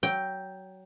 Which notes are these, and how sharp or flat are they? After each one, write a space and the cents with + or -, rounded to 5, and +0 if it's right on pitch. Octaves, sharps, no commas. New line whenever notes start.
F#3 +20 G5 +0